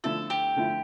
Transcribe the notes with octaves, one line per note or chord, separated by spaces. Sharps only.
D3 F3 A3 E4 A4
G4
D3 F3 A3 E4